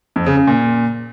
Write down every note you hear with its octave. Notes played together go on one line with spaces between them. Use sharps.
F2
C#3
C#3
A#2